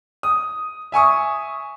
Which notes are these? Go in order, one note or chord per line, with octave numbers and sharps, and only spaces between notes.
D#6
E5 G#5 C#6 D#6